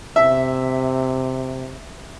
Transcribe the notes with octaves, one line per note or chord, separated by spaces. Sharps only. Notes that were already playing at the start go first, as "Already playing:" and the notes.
C3 E5